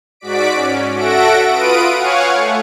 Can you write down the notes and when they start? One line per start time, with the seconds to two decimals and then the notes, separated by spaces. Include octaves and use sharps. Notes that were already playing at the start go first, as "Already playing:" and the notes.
0.20 G#2 F#4 D5 B6 D7
0.55 C#4
0.94 F#4 A4 E5 F#5 A#6 D7
1.49 F4 B4 D#6 D7 D#7
1.95 C#5 F5 F#5 G#5 C#6
2.29 A3